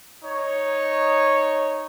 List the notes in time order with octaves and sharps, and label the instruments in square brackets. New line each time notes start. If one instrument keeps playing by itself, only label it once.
[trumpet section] D#4 C#5